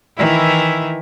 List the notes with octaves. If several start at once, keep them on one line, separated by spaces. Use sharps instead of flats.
D#3 E3 E4